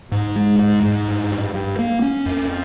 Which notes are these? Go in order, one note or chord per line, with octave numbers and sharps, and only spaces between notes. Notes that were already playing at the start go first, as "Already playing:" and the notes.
G#2
G#3
G#2
G#2
G2
G2
G2
A#3
C#4
F2